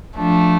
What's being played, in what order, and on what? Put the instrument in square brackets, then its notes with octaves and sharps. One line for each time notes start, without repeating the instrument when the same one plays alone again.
[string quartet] F3 A3 D4